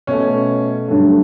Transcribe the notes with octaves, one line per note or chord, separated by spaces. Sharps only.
B2 A3 C#4
G2 D3 F#3 A3